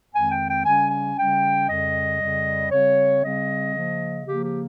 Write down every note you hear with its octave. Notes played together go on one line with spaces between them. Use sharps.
F2 D#3 G#3 C4 G#5
G5
G5
C#3 G3 C#4 G#5
G#5
C#3 G3 C#4 G5
F2 C#3 G3 D#5
F2 C#3 G3
C#3 G3 C4 C#5
C#3 G3 C4 D#5
C#3 F3 A#3
C#3 F3 A#3 G4
G4